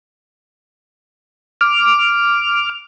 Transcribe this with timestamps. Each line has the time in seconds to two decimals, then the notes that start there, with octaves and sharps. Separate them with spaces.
1.61 D6 F6